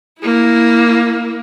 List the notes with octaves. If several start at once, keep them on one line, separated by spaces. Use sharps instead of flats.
A#3 E4